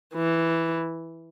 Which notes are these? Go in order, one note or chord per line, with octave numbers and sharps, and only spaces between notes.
E3